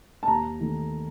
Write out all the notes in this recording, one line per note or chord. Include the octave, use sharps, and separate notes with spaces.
A5
D#2 A#5
D#3 A3